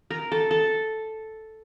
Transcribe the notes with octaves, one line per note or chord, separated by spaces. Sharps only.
A#4
A4
A4